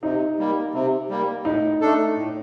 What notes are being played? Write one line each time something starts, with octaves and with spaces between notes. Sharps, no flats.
C3 D#4
G3 A#3
C3
G3 A#3
A2 D#4
A3 D4 A4
A2